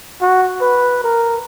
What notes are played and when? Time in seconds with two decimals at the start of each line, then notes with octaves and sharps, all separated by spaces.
0.21 F#4
0.61 B4
1.03 A#4